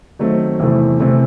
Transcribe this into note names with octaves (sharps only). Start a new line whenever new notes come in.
D#3 F#3 A3 C4
E2 C3 E3 A3 C4
C3 E3 A3 C4